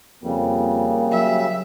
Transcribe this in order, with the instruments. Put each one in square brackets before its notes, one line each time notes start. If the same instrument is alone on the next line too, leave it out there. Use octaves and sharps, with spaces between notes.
[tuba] F2 [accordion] C#3 G3 [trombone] A#3
[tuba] F#3 [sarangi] E5